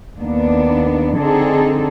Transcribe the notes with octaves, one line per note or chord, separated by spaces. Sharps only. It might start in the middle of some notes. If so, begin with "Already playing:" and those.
D#2 A#3 B3 D4
D3 C4 D4 D#4 G#4 A4